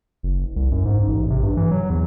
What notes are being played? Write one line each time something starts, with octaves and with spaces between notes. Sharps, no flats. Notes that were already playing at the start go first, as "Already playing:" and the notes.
F#1
C2
F#2
G#2
A1
C3
G2
E3
F#3
E2